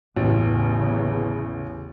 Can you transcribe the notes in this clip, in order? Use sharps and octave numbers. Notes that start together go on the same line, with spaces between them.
A1 E2 C#3